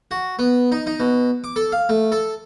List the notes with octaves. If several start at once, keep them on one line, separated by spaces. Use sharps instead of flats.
F#4
B3
D#4
D#4
B2
D6
A4
F5
A3
A4